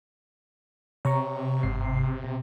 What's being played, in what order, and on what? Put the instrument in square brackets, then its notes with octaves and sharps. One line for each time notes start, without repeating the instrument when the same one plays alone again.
[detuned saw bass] C3 [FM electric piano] C#5 A#5 C#6
[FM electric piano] G1 G#2 C7
B2